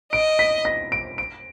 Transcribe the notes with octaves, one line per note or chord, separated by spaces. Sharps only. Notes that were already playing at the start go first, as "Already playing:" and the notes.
D#5 D7
B6
A#6
D7
D7